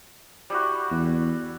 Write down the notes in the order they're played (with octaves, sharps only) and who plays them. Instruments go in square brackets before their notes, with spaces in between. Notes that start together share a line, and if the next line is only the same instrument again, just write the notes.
[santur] G3 E4 F#4
[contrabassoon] E2